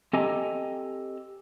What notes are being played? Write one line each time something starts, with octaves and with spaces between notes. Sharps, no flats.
C4 G4 A4 D#5 G#5 A#5